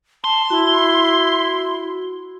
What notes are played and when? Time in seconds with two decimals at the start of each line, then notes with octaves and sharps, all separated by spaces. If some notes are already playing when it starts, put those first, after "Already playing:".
0.24 A5 C6
0.50 E4 F#4